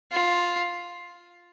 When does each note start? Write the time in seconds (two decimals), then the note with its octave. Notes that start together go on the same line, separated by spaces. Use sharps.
0.12 F4